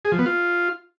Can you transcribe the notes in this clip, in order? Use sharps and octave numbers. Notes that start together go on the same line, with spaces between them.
G#4
F3
B3
F4